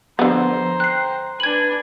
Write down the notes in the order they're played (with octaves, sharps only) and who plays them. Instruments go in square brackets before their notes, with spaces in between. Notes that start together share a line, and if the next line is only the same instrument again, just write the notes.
[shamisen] D3 B3 [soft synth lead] F3 [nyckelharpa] C5 A#5
[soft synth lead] G5 [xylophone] F#6 C7
[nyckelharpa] D4 G#5 [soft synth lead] B4 [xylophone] G#6 F#7